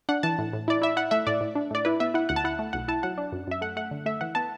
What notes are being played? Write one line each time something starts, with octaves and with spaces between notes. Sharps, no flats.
D4 F#5
E3 A5
A2
A2
E4 D5
E4 E5
E4 F#5
A3 E5
A2 D5
A2
D4
A2 D5
E4 B4
B3 E5
E4 F#5
D2 F#5
A5
E4 F#5
A3
B1 F#5
E4 A5
F#3 F#5
D4
F#2
F#2 E5
A3 F#5
A3 F#5
D3
A3 E5
E3 F#5
B3 A5